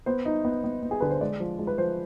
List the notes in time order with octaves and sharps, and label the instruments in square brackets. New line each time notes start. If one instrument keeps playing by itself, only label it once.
[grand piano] B3 C5
D#4
B3
B3
B3
G#4
D3 B4
C5
G#3 D5
F3
G#3
B4
F3 C5